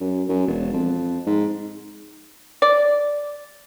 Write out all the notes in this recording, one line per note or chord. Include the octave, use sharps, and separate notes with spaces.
F#2
F#2
E1
F2
G#2
D5